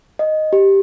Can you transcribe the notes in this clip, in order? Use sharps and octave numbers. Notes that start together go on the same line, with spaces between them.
D#5
G4